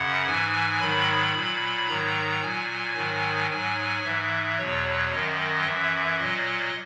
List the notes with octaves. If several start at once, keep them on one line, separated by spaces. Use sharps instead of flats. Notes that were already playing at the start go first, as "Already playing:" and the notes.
Already playing: F#2 C#3 F#5
G#2 E3 G#5
G#2 D#3 F#3 B5
A#2 F#3
G#2 D#3 F#3 A#5
A#2 F#3 G#5
G#2 D#3 F#3
G#2 F#3 G#5
G#2 E3 E5
E2 B2 F#3 C#5
F#2 D#3 F#3 D#5
F#2 E3 E5
A#2 F#3 D#5